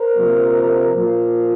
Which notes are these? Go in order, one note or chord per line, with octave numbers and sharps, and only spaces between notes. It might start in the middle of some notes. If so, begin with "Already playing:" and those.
Already playing: A#4 C5
C3 F3 A#3
A#2 F3 A#3